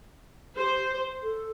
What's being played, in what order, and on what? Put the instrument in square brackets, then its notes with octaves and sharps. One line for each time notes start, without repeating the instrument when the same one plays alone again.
[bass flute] G4 [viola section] C5
[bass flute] A4